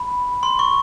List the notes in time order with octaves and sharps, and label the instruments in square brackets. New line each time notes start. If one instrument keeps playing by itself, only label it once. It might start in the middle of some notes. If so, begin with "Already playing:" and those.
Already playing: [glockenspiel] B5
C6
C#6